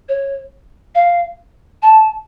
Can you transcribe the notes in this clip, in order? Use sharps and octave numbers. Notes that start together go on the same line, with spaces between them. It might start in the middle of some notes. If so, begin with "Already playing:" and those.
C#5
F5
A5